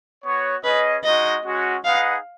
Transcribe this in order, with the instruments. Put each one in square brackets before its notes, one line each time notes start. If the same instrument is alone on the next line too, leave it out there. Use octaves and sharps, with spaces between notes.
[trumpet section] B3 F#4 C#5
[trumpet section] C#4 G#4 D#5 [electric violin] B4
[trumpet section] G#3 D#4 F#4 [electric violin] D#5
[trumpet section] G#3 C#4 F#4
[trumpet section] D#4 G#4 B4 D#5 F#5 [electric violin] F5